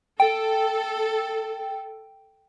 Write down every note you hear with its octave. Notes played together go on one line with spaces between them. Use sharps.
A4 G5